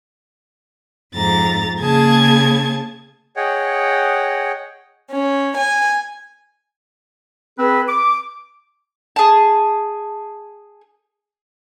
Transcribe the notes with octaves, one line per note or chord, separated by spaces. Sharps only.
F2 G#2 A#5 A6
C#3 A#3 G#4 A5 G#6
G#4 C#5 D#5 F#5 G5
C#4
G#5
C4 G#4 B4
D6
G#4 A5